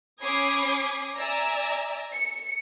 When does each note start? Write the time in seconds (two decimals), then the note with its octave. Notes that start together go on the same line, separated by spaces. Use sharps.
0.22 C#4 B5 D6 D#6 G#6 C7
1.18 D5 E5 G#5 A#5 E6
2.16 C#7